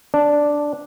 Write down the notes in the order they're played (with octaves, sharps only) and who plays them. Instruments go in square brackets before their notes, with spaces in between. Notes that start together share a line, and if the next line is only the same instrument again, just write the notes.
[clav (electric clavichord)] D4